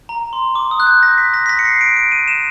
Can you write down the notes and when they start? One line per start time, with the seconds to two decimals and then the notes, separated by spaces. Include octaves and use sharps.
0.09 A#5
0.33 C6
0.55 D6
0.71 D#6
0.80 F#6
0.87 G6
1.03 A#6
1.18 B6
1.34 A#6
1.46 B6
1.49 A#6
1.59 C#7
1.65 C7
1.81 D7
1.97 D7
2.12 D#7
2.28 E7